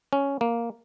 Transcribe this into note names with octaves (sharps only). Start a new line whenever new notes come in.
C#4
A#3